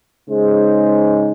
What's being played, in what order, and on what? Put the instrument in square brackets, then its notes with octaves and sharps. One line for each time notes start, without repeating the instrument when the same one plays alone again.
[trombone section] C#3 G#3 D#4 G#4 C5